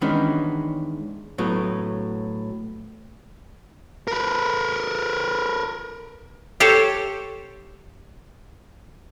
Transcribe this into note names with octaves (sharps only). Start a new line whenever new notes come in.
D#3 E3 G#3 B3 C#4 D4
A2 F#3 B3
A#4 B4
G4 A4 C5 C#5